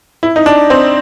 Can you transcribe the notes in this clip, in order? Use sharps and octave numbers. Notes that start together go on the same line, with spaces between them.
E4
D#4
D4
C4